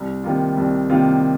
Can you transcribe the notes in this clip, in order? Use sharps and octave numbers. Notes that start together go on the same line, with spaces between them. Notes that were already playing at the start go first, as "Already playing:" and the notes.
Already playing: C2
C3 D#3 A#3 F4
C2
C3 D#3 A#3 F4